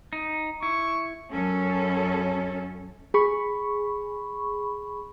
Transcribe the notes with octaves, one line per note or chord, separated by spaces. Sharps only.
D#4
E4 C#6
F#2 C#4 A4
G#4 B5 C#6